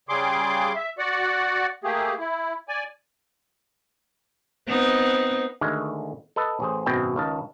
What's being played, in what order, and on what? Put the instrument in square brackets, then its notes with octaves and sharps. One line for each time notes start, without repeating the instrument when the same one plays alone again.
[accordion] C#3 G3 G#4 C6 D6
E5
F#4 D5 F#5
A3 A#3 G4 G#4
E4
D5 G#5
[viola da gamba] B3 C4 D#4
[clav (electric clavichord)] D2 D3 D#3 G#3
A4 B4 D#5 A5
A1 G#4 C5
G#1 F#2 B2 D#3 C4 G5
C#2 D#3 A5